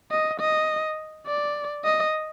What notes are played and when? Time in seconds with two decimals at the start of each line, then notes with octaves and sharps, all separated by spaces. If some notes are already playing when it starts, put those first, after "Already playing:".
0.11 D#5
0.40 D#5
1.27 D5
1.84 D#5